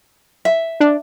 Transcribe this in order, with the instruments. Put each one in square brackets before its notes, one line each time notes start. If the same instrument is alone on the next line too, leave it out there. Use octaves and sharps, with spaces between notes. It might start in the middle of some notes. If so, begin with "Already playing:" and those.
[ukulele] E5
[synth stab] D4